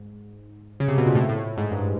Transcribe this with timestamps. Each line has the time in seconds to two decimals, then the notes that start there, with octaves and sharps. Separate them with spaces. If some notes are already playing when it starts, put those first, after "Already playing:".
Already playing: G#2
0.80 C#3
0.88 C3
0.98 B2
1.07 A#2
1.15 A2
1.29 A2
1.57 G#2
1.72 G2